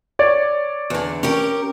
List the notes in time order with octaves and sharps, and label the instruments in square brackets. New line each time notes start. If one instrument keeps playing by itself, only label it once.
[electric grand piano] C#5 D5
[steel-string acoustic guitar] E2 D3
C#4 G4 A#4